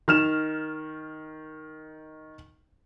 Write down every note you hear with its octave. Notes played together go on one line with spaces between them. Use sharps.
D#3 F6 E7